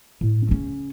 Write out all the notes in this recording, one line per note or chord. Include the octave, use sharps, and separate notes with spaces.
A2
C#3 C#4